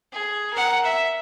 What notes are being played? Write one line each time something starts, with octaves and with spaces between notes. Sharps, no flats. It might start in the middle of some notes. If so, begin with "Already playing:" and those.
G#4
A#4 F#5
E5